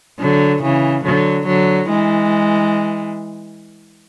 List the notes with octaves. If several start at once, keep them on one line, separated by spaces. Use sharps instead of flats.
D3 F#3
C#3 E3
D3 F#3
D3 F#3
E3 G#3